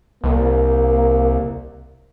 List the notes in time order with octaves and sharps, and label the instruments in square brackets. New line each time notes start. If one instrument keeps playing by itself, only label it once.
[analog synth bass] C2 [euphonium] A#3